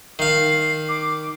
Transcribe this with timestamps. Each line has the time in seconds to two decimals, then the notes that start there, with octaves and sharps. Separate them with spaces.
0.19 D#3 F5 C7
0.89 D6